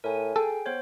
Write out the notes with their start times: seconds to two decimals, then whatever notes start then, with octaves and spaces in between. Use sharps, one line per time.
0.04 A2 A#4 G#5
0.36 G#4 A4 G5
0.66 B3 C5 C#5